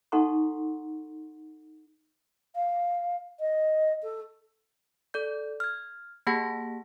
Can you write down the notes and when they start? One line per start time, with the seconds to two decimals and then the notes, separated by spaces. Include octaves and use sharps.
0.12 D#4 A4 F#5 A#5 C6 C#6
2.55 F5
3.39 D#5
4.02 A4
5.14 A4 D5 G6
5.60 F6 G#6
6.27 A#3 G4 G#4 F#5 A5 A#6